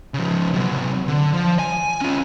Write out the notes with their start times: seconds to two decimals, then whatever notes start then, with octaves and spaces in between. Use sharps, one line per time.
0.14 C#3 F3
0.54 C3 F#3
1.08 D3
1.34 F3
1.59 G#5
2.01 C#4 F4